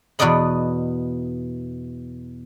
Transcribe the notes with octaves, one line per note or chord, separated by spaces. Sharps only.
E2 B2 B4 D5 D#5 B5